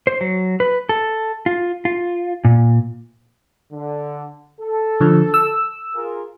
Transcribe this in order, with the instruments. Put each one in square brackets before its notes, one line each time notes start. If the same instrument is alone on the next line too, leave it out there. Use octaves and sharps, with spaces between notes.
[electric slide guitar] C5
F#3
B4
A4
F4
F4
A#2
[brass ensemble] D3
A4
[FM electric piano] D3 F3
E6
[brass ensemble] F4 G#4 A#4